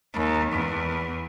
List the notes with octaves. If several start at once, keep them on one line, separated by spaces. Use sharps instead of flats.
D#2
E2